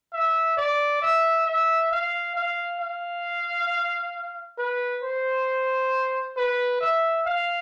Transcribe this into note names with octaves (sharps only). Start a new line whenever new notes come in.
E5
D5
E5
E5
F5
F5
F5
B4
C5
B4
E5
F5